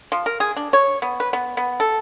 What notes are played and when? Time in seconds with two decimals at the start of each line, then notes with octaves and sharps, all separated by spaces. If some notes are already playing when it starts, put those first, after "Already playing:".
0.12 F3
0.26 A#4
0.40 G#4
0.57 D4
0.73 C#5
1.02 B3
1.20 B4
1.33 B3
1.57 B3
1.80 A4